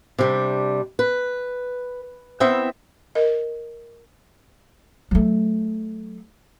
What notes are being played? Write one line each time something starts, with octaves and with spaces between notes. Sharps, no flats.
C3 G3 D4
B4
B3 C4 E4 E5 G5
A#4 D#5
F#3 A3